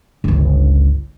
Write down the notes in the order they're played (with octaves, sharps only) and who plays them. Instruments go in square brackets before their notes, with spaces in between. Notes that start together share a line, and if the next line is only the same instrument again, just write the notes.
[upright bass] G1 C#2